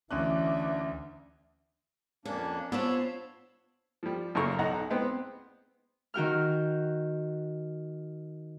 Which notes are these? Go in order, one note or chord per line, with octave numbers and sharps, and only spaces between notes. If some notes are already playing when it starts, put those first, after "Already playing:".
D2 E3 C#4 D4 E5 F#6
F2 A#3 C#4 D4
B3 D4 F4 C5 C#5 B5 E6
F3 G3
F#2 C#3 A#3 A#4 C#6
B1 D#4 F#5 A#5
G#3 B3 C4
D#3 F#4 G5 F6